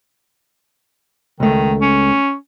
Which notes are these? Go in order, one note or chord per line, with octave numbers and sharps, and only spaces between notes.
C#2 D#3 A3
C#4